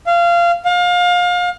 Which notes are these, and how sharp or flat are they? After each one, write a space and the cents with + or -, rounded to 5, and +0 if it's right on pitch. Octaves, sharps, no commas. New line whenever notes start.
F5 -20
F5 +30